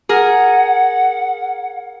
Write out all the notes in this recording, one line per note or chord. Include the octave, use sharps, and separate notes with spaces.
G#4 A#4 F#5